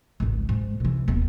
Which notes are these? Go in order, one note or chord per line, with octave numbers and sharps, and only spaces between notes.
G#1 C#2
G#2
C3 E3
D#1 B3